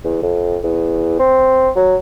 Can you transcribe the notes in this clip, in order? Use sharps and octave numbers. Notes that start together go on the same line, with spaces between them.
E2
F2
E2
C4
F#3